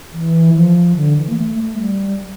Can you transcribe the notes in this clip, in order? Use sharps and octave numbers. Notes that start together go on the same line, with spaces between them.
E3
F3
D3
E3
A#3
A3
A3
G3